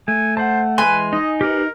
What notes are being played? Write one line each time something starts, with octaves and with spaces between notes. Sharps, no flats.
A3 G#5
C5 F#5 A5
E3 G#3 B4 G#5 C6
D#4 D#5
G4 A#4 B4